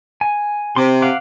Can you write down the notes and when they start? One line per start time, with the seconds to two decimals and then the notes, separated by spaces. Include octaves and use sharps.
0.21 G#5
0.76 C3 C6 D6
1.02 F5 F#5 D6